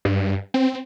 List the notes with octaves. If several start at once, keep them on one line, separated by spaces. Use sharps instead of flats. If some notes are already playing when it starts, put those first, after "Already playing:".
G2
C4